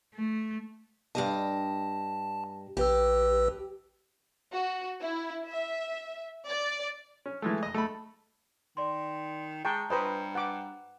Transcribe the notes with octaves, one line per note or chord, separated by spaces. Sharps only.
A3
G2 G4 D#5 A5
A#1 G4 B4 E6
F#4
E4
E5
D5
C#4
E3 G#3 A3
D#5 D#6
A3 B5
D#3 D5 C6
G#3 G5 A5 A#5 C#6
G2 B4 C5 D#5 A#5 B5
F#5 D6